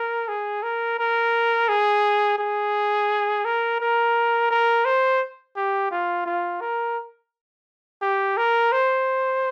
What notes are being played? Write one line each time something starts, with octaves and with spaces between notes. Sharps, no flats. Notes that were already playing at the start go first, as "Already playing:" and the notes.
Already playing: A#4
G#4
A#4
A#4
G#4
G#4
A#4
A#4
A#4
C5
G4
F4
F4
A#4
G4
A#4
C5